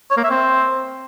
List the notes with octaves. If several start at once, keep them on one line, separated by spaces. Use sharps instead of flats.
C#5
A#3
E5
C4